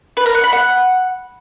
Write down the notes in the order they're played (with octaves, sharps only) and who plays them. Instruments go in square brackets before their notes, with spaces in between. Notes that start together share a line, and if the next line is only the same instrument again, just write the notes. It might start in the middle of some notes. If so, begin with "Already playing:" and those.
[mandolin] B4
A#4
F#5
B5
F#5